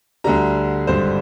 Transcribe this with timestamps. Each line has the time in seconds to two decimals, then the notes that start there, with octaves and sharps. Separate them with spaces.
0.24 D2 D3 G3 A#5
0.87 G#1 G2 D3 G3 C5